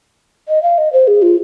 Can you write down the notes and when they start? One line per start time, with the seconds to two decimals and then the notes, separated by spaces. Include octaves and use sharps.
0.48 D#5
0.63 F5
0.78 D#5
0.93 C5
1.07 G#4
1.22 F4